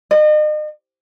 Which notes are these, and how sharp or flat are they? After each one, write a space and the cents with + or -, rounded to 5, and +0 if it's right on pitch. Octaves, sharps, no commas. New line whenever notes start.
D#5 -40